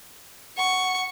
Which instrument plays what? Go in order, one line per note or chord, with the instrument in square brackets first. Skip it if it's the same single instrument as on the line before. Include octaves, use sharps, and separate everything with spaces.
[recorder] F#5 [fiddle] C#6